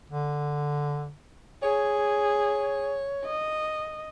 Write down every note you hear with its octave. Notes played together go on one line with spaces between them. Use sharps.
D3
G#4 C#5
D#5